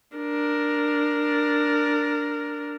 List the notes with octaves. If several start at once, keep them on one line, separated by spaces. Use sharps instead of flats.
D4 A#4